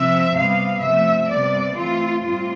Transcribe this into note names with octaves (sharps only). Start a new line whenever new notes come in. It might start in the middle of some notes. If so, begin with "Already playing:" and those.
Already playing: C3 F3 C4 E5
C3 G3 B3 F5
C3 F3 A3 E5
C3 G3 B3 D5
E3 A3 C4 F4
A2 G3 C4 F4